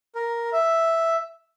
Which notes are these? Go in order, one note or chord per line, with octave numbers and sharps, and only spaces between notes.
A#4
E5